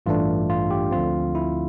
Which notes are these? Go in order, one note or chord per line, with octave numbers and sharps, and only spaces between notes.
A1 G2 E3 A3 D4 F4
F4
G4
D2 D3 F3 C4 F4
E4